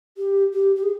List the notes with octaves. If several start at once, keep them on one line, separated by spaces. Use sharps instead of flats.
G4
G4
G4
G#4